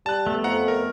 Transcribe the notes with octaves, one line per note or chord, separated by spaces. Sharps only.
G3 A5 F#6
A3 B3
F2 F#5 A#5
A#4